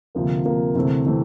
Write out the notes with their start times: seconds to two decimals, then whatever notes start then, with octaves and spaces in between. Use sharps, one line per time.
0.15 D2 C3 F3 A#3
0.45 D2 C3 F3 A#3
0.75 D2 C3 E3 A3 C4
1.06 C3 E3 A3 C4